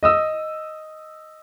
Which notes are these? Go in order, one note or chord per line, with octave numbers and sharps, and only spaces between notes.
D#5 D#6 E6